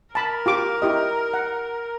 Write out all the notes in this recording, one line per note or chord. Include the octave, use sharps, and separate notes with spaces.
A#4 A5 B5
F4 G4 D6
E4 G4 D#5
F#5